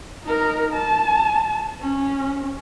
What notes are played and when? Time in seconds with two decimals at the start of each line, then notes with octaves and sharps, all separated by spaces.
0.23 D#4 A#4
0.74 A5
1.81 C#4